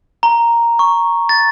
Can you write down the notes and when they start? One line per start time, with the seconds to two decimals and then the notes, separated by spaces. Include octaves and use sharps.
0.23 A#5
0.79 C#6
1.29 A6